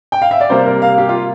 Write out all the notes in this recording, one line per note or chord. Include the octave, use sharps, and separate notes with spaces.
G5
F5
E5
D5
C3 G3 A#3 C5
A#4
F5
G4
F4